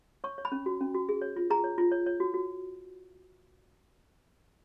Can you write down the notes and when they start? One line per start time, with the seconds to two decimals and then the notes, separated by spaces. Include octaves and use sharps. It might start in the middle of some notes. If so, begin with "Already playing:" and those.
0.24 C#5 C#6
0.38 C#5
0.45 B5
0.52 C#4
0.66 F#4
0.81 C#4
0.94 F#4
1.09 G#4
1.22 C#5
1.36 F4
1.50 G#4 A#5
1.64 C#5
1.78 F4
1.92 C#5
2.06 C#5
2.20 F#4
2.34 F#4